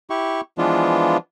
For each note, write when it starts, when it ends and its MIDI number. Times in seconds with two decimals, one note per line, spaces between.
0.10 0.41 64
0.10 0.41 67
0.10 0.41 85
0.58 1.17 52
0.58 1.17 53
0.58 1.17 56
0.58 1.17 59
0.58 1.17 62
0.58 1.17 65